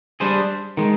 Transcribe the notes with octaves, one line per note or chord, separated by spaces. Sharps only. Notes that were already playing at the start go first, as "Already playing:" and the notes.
G3 D4 G#4 C5
D#3 G#3